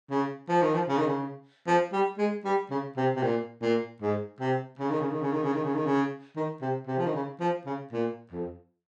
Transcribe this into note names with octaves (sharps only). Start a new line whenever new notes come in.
C#3
F3
D#3
F3
C#3
D#3
C#3
F3
G3
G#3
G3
C#3
C3
C3
A#2
A#2
G#2
C3
C#3
D#3
C#3
D#3
C#3
D#3
C#3
D#3
C#3
D#3
C#3
D#3
C3
C3
F3
D#3
C#3
F3
C#3
A#2
F2